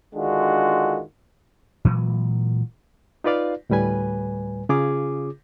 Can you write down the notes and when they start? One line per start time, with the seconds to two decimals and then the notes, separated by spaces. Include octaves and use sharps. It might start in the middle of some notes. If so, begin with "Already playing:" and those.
0.15 D3 D#3 G#3 D4 F4 F#4
1.85 A#2 E3 F#3 G#3
3.24 D#4 F4 B4 D5 F5
3.70 D2 A2 G3 B4 G#5
4.69 C#3 C#4 F4 G#4 D6